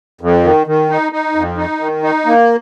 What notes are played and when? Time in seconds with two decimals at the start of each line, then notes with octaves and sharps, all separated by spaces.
0.21 F2
0.44 D#3
0.67 D#3
0.90 D#4
1.12 D#4
1.35 F2
1.57 D#4
1.80 D#3
2.03 D#4
2.26 A#3